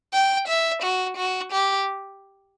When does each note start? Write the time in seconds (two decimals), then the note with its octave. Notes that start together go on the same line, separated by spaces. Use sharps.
0.13 G5
0.48 E5
0.83 F#4
1.17 F#4
1.52 G4